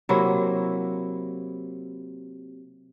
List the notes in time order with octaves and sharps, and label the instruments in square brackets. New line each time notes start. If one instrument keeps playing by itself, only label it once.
[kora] C3 F#3 A#3 E4